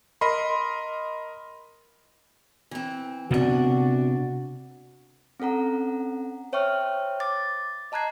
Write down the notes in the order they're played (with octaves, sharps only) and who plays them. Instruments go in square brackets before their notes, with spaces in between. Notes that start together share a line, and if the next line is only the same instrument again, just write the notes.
[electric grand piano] A#4 D#5 B5 C6
[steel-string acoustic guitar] E3 C4
[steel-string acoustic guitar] D2 D4 [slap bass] C3 B3 [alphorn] F#4
[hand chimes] C4 C#4 A4 F#5 A#5
C5 C#5 E5 G5 C#6 F6
D6 A6
D#5 A5 A#5 F#6 G#6 C7